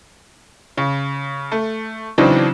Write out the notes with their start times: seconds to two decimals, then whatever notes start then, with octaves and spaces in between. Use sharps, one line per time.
0.78 C#3
1.52 A3
2.18 C#3 E3 F#3 C4 D4 D#4